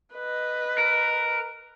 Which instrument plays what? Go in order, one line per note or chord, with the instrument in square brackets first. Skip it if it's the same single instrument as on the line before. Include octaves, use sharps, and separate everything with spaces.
[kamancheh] B4 D#5
[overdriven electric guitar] A#4